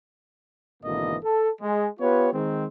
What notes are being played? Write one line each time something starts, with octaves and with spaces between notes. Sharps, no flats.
G#1 B2 D3 E3 A#3 D#5
A4
G#3
B3 F4 G4 B4 C#5
D#3 G#3 C4